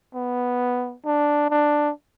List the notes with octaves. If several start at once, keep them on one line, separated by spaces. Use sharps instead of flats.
B3
D4
D4